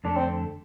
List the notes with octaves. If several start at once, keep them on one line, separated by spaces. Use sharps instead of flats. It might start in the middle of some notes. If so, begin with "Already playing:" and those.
F2 D3 A3 D4 E4 A4
C4